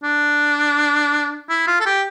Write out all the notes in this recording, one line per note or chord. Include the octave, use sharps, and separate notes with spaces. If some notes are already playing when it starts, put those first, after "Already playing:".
D4
E4
F4
A4
G4